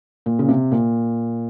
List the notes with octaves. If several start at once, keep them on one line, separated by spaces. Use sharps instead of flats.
A#2
C#3
C3
A#2